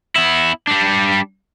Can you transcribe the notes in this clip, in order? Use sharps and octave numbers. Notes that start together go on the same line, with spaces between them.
B3 E4
G3 D4